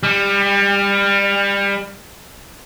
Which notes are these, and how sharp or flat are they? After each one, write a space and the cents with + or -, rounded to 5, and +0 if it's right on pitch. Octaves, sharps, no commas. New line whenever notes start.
G3 +25